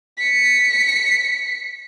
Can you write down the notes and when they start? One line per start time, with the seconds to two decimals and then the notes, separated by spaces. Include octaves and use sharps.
0.17 B6 C#7